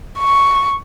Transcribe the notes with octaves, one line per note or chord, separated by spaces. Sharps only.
C#6